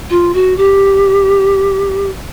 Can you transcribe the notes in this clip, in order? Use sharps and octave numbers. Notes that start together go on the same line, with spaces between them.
F4
F#4
G4